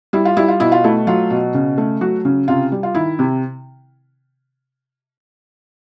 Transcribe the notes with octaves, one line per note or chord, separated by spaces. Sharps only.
G3 E4
F4
G3 E4
F4
B2 E4
F4
A3 E4
F#3 F4
B2
C#3
A3
F#3 F#4
C#3
C3 F4
G3
F4
D#3 E4
C3